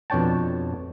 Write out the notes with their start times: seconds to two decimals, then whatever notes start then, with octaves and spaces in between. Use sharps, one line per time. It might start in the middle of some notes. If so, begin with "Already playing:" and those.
0.10 F2 B2 D4 C#5 G5 A5